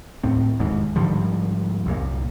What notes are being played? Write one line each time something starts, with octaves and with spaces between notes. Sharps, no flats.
D#2 A2 C4
E1 D#2 G#2
G#2 D3 F3 G3
C2 F#2 A#2